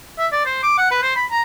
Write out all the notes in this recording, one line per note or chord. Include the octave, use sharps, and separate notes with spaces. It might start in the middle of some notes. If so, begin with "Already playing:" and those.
E5
D5
C5
D6
F#5
B4
C5
B5
A#5